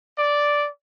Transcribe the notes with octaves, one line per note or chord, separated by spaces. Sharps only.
D5